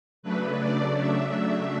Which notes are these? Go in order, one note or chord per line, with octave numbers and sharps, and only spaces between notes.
C#3 F#3 A3 D4 B4
D5
E5